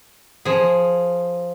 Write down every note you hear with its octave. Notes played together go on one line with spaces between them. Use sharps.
F3 G#4